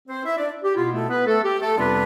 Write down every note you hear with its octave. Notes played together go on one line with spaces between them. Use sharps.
C4 C5
E4 E5
D4 D5
G4
B2 B3 E4 F4
A3 A4
B3 B4
A3 A4
G4
A3 A4
F2 C3 G3 B3 D4 F4 B4